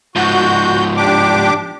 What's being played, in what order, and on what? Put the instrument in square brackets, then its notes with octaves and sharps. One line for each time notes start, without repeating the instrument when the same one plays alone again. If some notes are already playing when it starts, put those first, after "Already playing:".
[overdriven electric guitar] G#2 F3 [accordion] F#4 G6
[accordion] D4 G4 D6